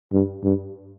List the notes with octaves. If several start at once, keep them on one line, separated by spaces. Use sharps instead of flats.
G2
G2